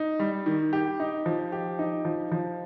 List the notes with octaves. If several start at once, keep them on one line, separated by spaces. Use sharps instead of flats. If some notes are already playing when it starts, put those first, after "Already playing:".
Already playing: D#4
G3
D#3
G4
D#4
F3
G4
D#4
F3
F3